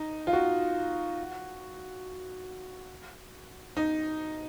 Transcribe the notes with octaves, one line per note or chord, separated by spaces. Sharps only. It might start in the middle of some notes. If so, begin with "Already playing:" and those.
Already playing: D#4
F4
F#4
D#4